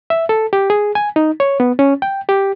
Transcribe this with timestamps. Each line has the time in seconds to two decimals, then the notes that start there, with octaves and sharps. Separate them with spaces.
0.10 E5
0.29 A4
0.53 G4
0.70 G#4
0.95 G#5
1.16 D#4
1.40 C#5
1.60 B3
1.79 C#4
2.02 G5
2.29 G4